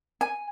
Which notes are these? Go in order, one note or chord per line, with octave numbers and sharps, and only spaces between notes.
G#5